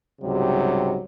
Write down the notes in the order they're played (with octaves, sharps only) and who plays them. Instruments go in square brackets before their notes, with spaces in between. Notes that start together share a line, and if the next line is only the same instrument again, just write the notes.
[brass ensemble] C#2 G#2 C3 F#3 G3